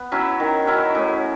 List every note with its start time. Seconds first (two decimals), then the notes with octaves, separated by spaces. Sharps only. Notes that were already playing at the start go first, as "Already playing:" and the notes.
Already playing: B3
0.12 F#3 C#4 E4
0.40 D#3
0.67 F#3 C#4 E4
0.95 A2